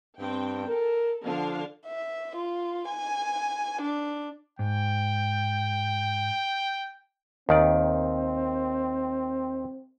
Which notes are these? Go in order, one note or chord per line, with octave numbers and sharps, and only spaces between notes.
G2 C4 G5
A4 A#4
D3 F3 D4 F5
E5
F4
G#5
D4
G#2 G5
D#2 D#3 C4 D5